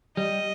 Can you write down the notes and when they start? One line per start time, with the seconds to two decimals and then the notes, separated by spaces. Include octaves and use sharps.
0.17 G3 D#5